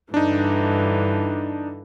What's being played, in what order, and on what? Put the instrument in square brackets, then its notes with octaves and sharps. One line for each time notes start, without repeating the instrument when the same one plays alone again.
[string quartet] G2 D3 E3 [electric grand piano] D4 D#4